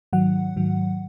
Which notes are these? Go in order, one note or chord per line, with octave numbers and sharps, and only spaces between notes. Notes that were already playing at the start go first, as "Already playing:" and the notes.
G#2 D#3 F#3 F#5
G#2 D#3 F#3